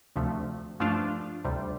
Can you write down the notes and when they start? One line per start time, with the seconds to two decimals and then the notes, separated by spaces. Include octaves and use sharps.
0.16 D2 C3 F3 A3
0.80 G2 F3 A3 D4 F4
1.45 D2 C3 G3